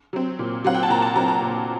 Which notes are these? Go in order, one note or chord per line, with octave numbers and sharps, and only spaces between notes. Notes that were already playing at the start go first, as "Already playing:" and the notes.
F#3 C4
A#2
F#3 C4 F#5
G5
A5
A#2 A#5
A5
F#3 C4 A#5
A#5
A#2